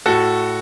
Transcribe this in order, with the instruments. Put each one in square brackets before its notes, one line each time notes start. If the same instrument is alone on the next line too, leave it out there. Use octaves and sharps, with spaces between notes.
[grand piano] A2 F#4 A4